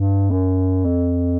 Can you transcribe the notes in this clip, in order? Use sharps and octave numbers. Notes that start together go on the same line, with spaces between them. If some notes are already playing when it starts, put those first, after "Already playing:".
Already playing: G2
F#2
F2